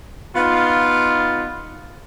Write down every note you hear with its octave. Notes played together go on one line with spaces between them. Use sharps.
B3 D#4 F4